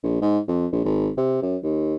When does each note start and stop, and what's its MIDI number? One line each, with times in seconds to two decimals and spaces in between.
0.03 0.18 34
0.22 0.39 44
0.48 0.67 41
0.72 0.81 34
0.85 1.09 32
1.17 1.38 48
1.42 1.57 42
1.63 1.95 39